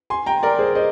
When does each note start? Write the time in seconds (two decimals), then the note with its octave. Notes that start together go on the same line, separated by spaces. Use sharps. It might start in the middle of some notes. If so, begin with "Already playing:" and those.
0.10 G#5 C6
0.26 G5 A#5
0.43 A#4 D5
0.59 G#4 C5
0.75 C5 D#5